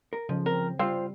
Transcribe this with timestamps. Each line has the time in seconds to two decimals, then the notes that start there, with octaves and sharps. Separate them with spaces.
0.13 A#4
0.29 C#3 F3
0.46 C4 A#4
0.79 G3 C4 F4 C5 F5